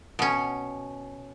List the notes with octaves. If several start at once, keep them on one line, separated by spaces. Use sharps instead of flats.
B2 C#4